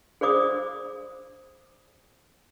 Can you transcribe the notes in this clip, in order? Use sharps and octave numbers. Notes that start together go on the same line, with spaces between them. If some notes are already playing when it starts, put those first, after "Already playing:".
G#4 C5 D5 D6 D#6